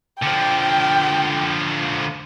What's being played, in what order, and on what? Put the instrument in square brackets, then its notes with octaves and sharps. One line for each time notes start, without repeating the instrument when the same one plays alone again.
[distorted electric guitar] D3 F3 [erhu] G5